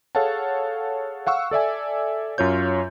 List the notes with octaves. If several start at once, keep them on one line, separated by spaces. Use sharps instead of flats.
G#4 A4 C#5 F5 F#5 A5
F5 F#5 C#6 E6
A4 D5 E5 G#5
F#2 F4 C#5 G6